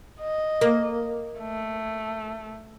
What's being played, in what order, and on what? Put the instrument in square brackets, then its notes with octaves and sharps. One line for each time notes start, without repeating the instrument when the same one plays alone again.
[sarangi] D#5
[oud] A#3
[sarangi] A3